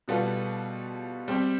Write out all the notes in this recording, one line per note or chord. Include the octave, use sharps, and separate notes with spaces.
B2 G3 B3 F4 A4
G3 C4 G4